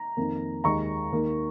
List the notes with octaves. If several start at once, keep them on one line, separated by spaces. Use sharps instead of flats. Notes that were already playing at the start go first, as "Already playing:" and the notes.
Already playing: A#5
F2 D#3 A#3
D#2 D#3 G#3 A#5 C#6
D#2 D#3 A#3